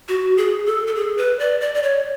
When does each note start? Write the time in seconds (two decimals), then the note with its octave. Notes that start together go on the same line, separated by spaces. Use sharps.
0.08 F#4
0.37 G#4
0.66 A4
0.87 A4
0.95 G#4
1.18 B4
1.39 D5
1.61 D5
1.75 D5
1.83 C#5